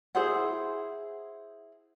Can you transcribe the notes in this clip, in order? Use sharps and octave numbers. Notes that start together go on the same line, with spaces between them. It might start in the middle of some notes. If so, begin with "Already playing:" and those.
E4 G#4 C5 F#5